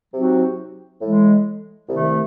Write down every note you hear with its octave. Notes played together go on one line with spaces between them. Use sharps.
C3 F#3 C4 D#4 F#4
A2 E3 G#3
C2 C3 D#3 A3